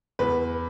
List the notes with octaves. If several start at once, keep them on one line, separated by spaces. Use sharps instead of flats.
E2 B4